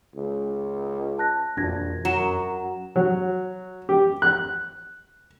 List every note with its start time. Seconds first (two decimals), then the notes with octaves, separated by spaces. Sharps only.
0.16 C#2
1.18 A5 F#6 A#6
1.57 E1 A#1 F2 D4 F#4 G#6 A#6
2.05 F#2 F#3 A#5 E7
2.96 F#3
3.89 G4
4.22 F#6